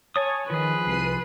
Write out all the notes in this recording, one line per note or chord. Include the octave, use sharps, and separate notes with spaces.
C#5 G#5 A5 D#6
D#3 F3 G#4 B4
C2 C7 D#7